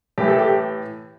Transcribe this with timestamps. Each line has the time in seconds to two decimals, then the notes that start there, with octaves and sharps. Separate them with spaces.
0.18 A2 E3 G4
0.28 A4
0.39 G4